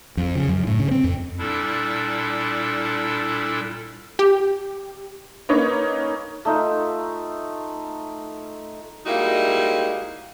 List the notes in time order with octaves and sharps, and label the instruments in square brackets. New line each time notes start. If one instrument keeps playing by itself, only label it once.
[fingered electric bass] F2
C#3
F#2
A2
C#3
C4
F2
[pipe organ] A#2 G3 D4 E4 A4
[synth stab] G4
[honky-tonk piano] A#3 C#4 D#4 B4 C#5
[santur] A3 D#4 F4
[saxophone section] G3 G#3 A#3 D#4 E4 F#4